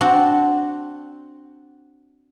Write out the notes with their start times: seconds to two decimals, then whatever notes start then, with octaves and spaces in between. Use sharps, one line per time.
0.01 C4 D4 F#4